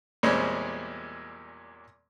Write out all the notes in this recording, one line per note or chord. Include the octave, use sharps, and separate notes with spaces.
E2 A#2 G3 G#3 C4 C#4